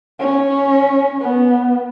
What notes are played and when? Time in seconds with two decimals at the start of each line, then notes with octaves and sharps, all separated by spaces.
0.20 C#4
1.21 B3